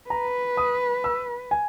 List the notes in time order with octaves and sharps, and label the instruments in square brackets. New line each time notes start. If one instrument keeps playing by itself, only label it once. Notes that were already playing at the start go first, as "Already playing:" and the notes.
[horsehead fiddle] B4 [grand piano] A#5
[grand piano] D#6
E6
G#5